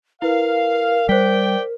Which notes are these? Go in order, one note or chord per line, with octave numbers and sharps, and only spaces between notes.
E4 A#4 B4 F5
G3 C5 D5 G5 B6